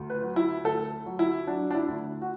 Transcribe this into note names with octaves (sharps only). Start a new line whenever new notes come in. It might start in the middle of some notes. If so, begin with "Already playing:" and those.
Already playing: D2
B4
F#3
E4
D2 A4
F#3
E4
F#3 D4
D4
E4
D2
F#4